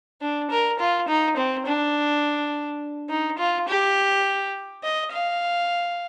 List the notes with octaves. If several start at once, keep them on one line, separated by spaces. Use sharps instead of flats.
D4
A#4
F4
D#4
C4
D4
D#4
F4
G4
D#5
F5